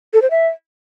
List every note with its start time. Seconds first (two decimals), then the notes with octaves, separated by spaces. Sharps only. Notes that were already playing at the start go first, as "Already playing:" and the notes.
0.14 A4
0.22 C5
0.31 E5